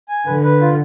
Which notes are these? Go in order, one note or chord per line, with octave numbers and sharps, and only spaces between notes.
G#5
D3 B4
B4
F4